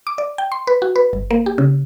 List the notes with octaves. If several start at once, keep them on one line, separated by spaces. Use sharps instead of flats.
D6
D5
G5
C6
B4
F#4
B4
G1
A#3
G4
C#3